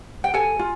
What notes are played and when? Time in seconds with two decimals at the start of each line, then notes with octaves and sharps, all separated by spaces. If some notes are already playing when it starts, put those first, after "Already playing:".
0.24 G5
0.34 A4 G#5
0.59 F4